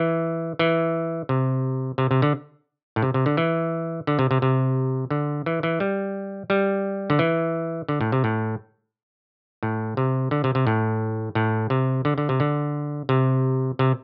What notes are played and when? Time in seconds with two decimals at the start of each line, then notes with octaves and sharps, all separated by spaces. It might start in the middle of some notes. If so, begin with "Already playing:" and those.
Already playing: E3
0.59 E3
1.29 C3
1.98 C3
2.11 C3
2.22 D3
2.96 A2
3.03 C3
3.14 C3
3.26 D3
3.37 E3
4.07 D3
4.19 C3
4.31 C3
4.42 C3
5.10 D3
5.46 E3
5.63 E3
5.80 G3
6.50 G3
7.10 D3
7.19 E3
7.89 D3
8.01 A2
8.12 C3
8.24 A2
9.63 A2
9.97 C3
10.31 D3
10.44 C3
10.55 C3
10.67 A2
11.35 A2
11.70 C3
12.05 D3
12.18 D3
12.29 C3
12.40 D3
13.09 C3
13.79 C3